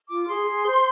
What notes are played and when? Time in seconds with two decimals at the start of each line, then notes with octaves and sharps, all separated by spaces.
0.09 F4 D6
0.27 G#4 C6
0.47 G#4
0.66 C5